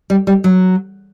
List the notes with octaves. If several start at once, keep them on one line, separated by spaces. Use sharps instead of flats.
G3
G3
F#3